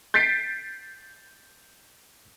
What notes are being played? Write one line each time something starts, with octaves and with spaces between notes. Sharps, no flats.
G6 A6 B6 C7 D7